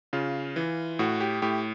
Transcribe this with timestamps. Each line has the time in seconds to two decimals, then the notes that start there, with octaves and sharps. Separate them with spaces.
0.13 C#3 F4
0.56 E3
0.99 A2 F#4
1.21 G4
1.42 A2 G4